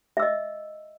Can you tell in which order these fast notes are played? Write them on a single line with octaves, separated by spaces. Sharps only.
E5 E6 D#5